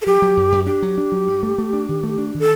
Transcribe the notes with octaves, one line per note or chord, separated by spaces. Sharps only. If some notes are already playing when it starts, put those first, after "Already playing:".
A4
F#3 G4
F#3
F#2
F#2
D4 G4
F#3
D4
F#3
G2
A3
A3
D4
D#3
A3
D4
D#3 A4